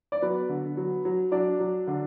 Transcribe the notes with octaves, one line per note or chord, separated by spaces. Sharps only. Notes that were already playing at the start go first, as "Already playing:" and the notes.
D5
F#3 B3 B4
D3
F#3
F#3
F#3 D4 D5
F#3
D3